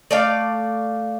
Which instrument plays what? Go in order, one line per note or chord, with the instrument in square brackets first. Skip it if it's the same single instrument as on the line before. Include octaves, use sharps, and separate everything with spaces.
[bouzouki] A3 D5 F5